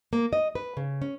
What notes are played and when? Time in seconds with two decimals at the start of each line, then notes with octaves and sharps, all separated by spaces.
0.13 A#3
0.33 D#5
0.55 B4
0.77 C#3
1.02 C#4